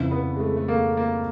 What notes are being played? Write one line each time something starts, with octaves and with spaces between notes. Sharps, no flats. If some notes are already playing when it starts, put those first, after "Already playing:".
Already playing: F2 C#3 E3
B3
G#3
A3
A3
A#3
A#3